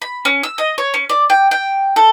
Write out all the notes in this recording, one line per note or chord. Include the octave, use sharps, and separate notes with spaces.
B5
C#4
E6
D#5
C#5
C#4
D5
G5
G5
A4